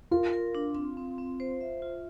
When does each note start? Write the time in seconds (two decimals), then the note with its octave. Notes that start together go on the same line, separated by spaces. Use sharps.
0.11 F4 A#4
0.33 A#4
0.55 D4
0.75 C4
0.97 C4
1.18 C4
1.40 C5
1.61 E5
1.82 F4